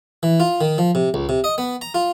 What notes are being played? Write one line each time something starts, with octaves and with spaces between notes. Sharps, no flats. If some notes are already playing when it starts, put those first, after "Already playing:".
E3
F4
D#3
F3
C3
C#2
C3
D#5
B3
A#5
F4